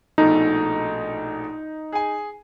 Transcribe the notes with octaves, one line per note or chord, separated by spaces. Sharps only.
A#1 B2 A3 D#4
G#4 G#5